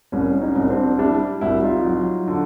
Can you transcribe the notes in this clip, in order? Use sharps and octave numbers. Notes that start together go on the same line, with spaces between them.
C2 C#4
C#4 D#4
C2
C4 D4
G3 D4 E4
C2 E4 F#4
D#4 F4
F#3
D3